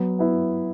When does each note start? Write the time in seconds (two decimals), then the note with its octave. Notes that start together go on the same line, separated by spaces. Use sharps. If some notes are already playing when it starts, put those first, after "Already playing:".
Already playing: F#3 B3
0.19 B3 E4